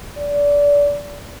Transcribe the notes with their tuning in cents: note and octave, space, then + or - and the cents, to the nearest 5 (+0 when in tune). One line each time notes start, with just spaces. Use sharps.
D5 -25